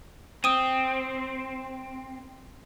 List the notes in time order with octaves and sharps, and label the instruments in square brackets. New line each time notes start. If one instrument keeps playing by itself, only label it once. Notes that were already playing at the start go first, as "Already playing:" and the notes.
[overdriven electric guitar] C4 [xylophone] D#6 D#7